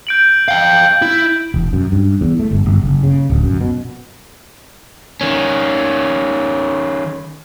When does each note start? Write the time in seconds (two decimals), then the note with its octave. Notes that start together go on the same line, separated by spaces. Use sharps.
0.07 G6 D7 F#7
0.48 F5 G5
1.02 E4 G6
1.54 E1
1.73 F#2
1.92 G2
2.21 E2
2.39 A3
2.51 G1
2.66 G1
2.82 F#1
3.03 C#3
3.30 D1
3.44 F#2
3.61 B2
5.21 D#3 C#4